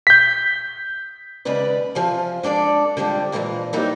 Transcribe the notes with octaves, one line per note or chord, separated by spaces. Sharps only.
G6 B6
D#2 C#3 G#3 B4 D5
C3 F3 F4 G#5
G#3 D4 A4 D5
D3 F3 G3 G#3
A#2 D3 E3 F3 G#3
E3 F#3 G3 A#3 C4 D#4